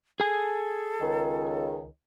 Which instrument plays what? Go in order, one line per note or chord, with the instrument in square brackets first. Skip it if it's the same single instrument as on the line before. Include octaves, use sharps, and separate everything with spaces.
[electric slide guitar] G#4 G#5 [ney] A4
[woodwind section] C#2 D#3